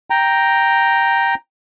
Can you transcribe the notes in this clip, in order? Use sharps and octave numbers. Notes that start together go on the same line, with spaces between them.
G5 A#5